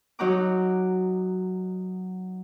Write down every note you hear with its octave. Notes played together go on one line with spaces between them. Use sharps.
F#3 D#4 C#5 F#5 A#5 D6